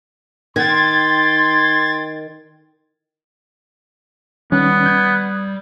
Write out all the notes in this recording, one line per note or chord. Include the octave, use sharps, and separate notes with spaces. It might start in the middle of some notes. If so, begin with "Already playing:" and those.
D#3 G5 C6 G#6 A6
D#3 G3 B3 C#4
G6 G#6